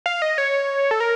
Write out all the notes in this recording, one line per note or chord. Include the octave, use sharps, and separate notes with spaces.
F5
D#5
C#5
A4
A#4